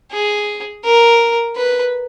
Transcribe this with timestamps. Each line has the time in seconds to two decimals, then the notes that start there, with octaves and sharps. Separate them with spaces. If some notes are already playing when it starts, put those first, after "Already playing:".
0.11 G#4
0.84 A#4
1.56 B4